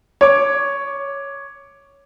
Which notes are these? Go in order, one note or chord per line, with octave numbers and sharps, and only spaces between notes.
C#5 D6